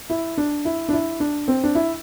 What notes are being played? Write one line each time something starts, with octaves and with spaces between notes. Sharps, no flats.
E4
D4
E4
D4
E4
D4
C4
D4
E4